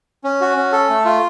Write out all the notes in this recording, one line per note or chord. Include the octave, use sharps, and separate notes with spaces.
C#4
F#4
C#4
A4
A3
F4